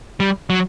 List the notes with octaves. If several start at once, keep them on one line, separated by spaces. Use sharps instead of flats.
G3
F#3